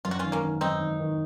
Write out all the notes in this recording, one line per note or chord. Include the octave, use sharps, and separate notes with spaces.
F#2 F4
F#4
G#1 C#4 F4
A#3 C#4
G#1
F#2 C4 D#4
G#1
D#3